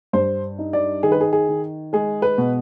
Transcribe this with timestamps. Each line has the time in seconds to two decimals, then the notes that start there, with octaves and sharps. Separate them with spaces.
0.13 G2 C5
0.59 D#4
0.73 D5
1.03 D#3 G#4
1.12 B4
1.21 G#4
1.33 G#4
1.49 D#3
1.93 G#3 G#4
2.22 B4
2.38 B2